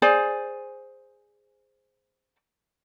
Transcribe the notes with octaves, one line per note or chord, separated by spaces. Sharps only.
G#4 C5 D5 G#5